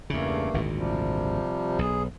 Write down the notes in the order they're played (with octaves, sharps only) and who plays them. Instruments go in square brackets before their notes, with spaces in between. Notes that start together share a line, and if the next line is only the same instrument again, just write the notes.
[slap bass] E2 C#3 [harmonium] G2 A3 A#3
[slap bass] G#1 D2 A#2
[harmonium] C3 F3 G3
[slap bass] B1 [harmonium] G#4